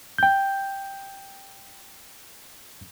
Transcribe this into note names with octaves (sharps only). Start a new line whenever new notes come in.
G5 G6